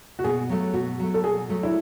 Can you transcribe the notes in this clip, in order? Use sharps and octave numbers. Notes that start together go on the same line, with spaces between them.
F#4
B2 G#4
F#3 A3
B2 F#4
F#3 A3
A4
B2 G#4
F#3 A3
E4